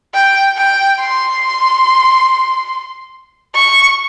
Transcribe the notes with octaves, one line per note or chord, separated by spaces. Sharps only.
G5
G5
C6
C#6